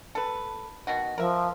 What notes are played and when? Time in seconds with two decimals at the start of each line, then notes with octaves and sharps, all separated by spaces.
0.15 A4 B4
0.87 B2 D#3 F#4
1.18 F3 A#4 E5